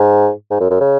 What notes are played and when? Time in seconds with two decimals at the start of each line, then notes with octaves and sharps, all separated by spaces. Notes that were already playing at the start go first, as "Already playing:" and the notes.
Already playing: G#2
0.50 G#2
0.60 F#2
0.70 F#2
0.81 C#3